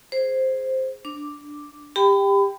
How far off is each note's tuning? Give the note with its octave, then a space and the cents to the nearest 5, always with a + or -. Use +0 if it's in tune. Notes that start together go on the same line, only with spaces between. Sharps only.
G#4 +0 C5 +0
D4 +0 D6 +0
G4 +20 G5 +0 B5 +30